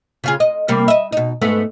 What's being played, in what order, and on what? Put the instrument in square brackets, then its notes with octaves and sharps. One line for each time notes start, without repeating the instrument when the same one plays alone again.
[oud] C#3 F4 G#4
D#5
C3 G3 A#3
D#5 E5
B2 D#4
G#2 A3 B3